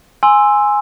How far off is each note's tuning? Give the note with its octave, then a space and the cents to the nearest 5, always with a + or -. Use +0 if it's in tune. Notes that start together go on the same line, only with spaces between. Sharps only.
G#5 +0 C6 +5 E6 +0